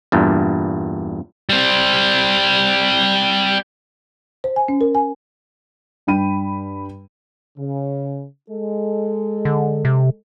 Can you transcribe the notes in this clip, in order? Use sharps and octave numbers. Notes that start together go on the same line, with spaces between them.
E2 G2 A#2
G3 C4
C5
G#5
C#4
A#4
G#5
G2 D4 G5 B5 D#7
C#3
G#3 A4
D3
C3